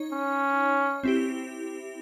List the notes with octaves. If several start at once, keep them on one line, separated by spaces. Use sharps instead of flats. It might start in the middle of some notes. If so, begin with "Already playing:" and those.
Already playing: D#4 C#5
C#4
C4 E4 G4